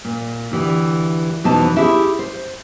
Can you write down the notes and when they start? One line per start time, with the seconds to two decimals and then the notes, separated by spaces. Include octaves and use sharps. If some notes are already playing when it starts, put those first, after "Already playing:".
0.05 A#2
0.52 D2 E3 G4
1.44 F2 B2 E3 B3 D#4 A5
1.76 E4 G4 G#4 E5
2.19 C5